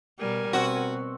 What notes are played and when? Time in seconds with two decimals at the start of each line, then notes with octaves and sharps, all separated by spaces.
0.19 B2 G3 A#4 G#5
0.53 B2 C4 F#4